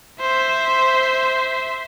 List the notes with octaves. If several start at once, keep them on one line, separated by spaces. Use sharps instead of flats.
C5 E5